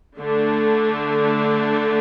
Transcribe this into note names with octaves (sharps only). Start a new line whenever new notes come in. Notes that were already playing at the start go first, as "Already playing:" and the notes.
D3 A3 D4